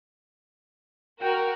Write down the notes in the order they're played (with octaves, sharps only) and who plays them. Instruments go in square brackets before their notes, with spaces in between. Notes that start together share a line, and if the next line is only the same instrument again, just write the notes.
[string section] F#4 A#4 [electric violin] G5